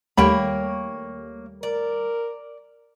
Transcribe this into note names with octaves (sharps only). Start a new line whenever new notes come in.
D#2 G3 A3 A#3 G4 C#5 G5 B5
A#4 D5